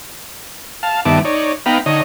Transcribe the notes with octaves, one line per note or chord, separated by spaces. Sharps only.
F5 A5
G2 D#3 B3 E4 A5 D6
D#4 C#5 D5
B3 D#4 F5 G5 A#5 B5
D3 D#4 C#5 D#5